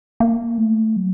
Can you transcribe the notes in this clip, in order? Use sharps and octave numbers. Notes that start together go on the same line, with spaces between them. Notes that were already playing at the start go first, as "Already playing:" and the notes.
A#3
A3
F#3